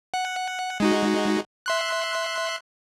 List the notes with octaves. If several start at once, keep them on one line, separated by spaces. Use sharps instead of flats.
F#5
G#3 D#4 F#4
E5 C6 F#6